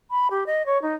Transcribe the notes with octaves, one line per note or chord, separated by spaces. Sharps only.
B5
G4
D#5
C#5
D#4